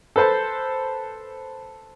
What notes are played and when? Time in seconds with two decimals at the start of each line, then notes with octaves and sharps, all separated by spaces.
0.16 A4 B4 C5 A5